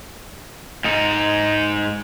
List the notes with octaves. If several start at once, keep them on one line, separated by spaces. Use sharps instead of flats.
G#2 D#4